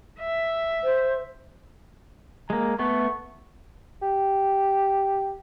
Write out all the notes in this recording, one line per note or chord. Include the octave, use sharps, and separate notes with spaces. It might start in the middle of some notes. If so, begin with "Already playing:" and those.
E5
C5
G#3 A#3 A#5
A3 B3 C#6
G4